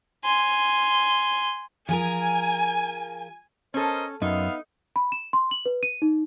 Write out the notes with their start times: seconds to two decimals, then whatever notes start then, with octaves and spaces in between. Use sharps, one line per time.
0.25 G#5 C6
1.89 F3 G#4 A#4 G#5
3.74 C#4 A4 A#4 C5 D#5
4.22 F#2 B3 D#4 E5 F5
4.96 B5
5.12 E7
5.33 C6
5.51 F#7
5.66 B4
5.83 D#7
6.02 D#4